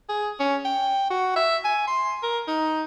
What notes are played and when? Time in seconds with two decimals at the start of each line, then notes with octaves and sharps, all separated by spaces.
0.09 G#4
0.40 C#4
0.65 G5
1.11 F#4
1.36 E5
1.65 G#5
1.87 C6
2.23 A#4
2.48 D#4